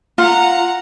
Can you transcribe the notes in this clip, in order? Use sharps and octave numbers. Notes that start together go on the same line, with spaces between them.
F4 F#5 A#5